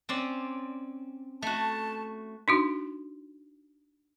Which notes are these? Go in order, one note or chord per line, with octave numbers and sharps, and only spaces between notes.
C4 C#4 D5
A3 F#4 A5
D4 D#4 F#4